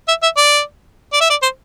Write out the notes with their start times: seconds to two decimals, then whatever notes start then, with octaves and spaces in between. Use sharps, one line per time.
0.08 E5
0.23 E5
0.37 D5
1.13 D5
1.21 E5
1.30 D5
1.43 C5